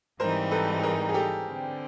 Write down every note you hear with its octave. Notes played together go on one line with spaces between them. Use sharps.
G#2 E3 G3 C4 D#4 A#4 C5
A4 B4
G#4 A#4
G#4
G4 A4
D3 G3 C4